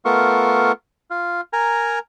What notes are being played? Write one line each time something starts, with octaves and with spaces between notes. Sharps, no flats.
A3 B3 F4 A#4 C#6
F4
A#4 G#5 A#5